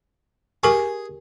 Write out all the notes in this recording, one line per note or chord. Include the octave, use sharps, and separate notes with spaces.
G4 G#4 A#4 C#6